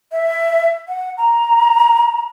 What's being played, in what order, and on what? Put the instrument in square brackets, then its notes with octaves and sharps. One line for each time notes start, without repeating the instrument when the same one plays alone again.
[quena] E5
F#5
A#5